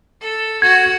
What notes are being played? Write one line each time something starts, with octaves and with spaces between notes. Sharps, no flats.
A4
F#4 G#6